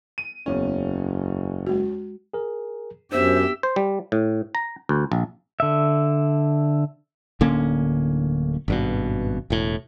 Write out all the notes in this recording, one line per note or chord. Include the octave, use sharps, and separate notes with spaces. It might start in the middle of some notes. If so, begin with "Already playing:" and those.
D#7
F#1 E2 C#4
G#3 F#4
G#4 A#4
F#2 B3 D4 G4 C5 E5
C5
G3
A2
A#5
D2
A#1
D3 E5
D1 D3 A#3 C#4
G#1 G2 B2
E1 A2